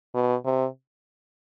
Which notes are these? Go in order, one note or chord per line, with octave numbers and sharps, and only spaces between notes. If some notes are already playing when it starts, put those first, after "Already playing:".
B2
C3